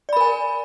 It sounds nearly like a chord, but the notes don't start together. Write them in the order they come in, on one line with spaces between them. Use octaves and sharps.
D5 B5 A#4 G#5